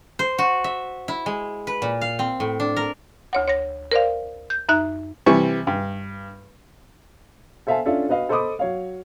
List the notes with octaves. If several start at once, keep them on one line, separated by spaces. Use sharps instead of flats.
C5
F#4
E5
E4
G#3
B4
A#2
F5
C4
A2
D4
A#4
D2 C#5 F#5
C#5 A#6
A#4 C5 D5 F5
G6
F#2 D#4 E5 F#6
C3 E3 G3 C#6
G2
A4 C5 E5 F5 G#5 A5
C#4 D4 F4 A4 E5
F#4 B4 D#5 F5
A4 C5 D#5 B5 D6 D#6
F#3 C#5 F5